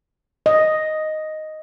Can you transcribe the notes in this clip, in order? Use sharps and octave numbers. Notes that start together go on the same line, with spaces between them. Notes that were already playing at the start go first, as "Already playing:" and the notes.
D#5